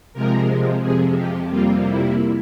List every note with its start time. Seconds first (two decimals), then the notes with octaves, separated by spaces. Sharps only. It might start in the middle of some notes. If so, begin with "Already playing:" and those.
0.13 C3 F3 G#3 A#4
0.82 F2 C3 F3 G#4
1.16 G4
1.50 F2 C3 G3 A#3 F4
1.84 E4